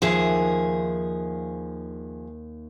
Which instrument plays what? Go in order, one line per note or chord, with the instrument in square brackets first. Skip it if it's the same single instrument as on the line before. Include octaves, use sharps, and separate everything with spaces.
[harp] D#2 E5 [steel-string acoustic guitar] F3 G#4